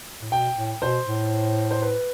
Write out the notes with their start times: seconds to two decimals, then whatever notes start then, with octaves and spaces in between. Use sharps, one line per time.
0.21 A2
0.31 B2 G5
0.56 A2
0.82 B2 C5
1.07 A2
1.71 C5
1.82 B4